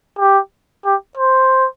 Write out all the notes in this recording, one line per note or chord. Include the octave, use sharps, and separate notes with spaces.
G4
G4
C5